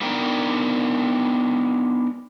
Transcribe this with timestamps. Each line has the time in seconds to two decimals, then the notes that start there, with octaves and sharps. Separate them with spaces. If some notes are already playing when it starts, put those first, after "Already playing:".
0.01 B3 D4 D#4 A#4 G5 A#5